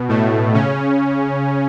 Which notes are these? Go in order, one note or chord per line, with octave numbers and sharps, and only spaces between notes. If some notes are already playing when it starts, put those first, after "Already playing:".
Already playing: B2
A2 A3
C#3 C#4